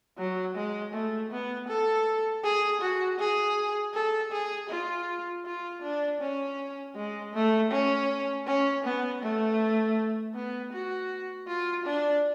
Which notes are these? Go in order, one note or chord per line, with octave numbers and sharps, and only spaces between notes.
F#3
G#3
A3
B3
A4
G#4
F#4
G#4
A4
G#4
F4
F4
D4
C#4
G#3
A3
C#4
C#4
B3
A3
B3
F#4
F4
D4